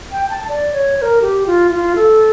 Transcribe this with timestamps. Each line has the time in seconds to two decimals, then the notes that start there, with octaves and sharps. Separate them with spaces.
0.12 G5
0.30 A5
0.48 D5
0.73 C#5
0.98 C#5
1.02 A#4
1.22 G4
1.47 F4
1.71 F4
1.96 A4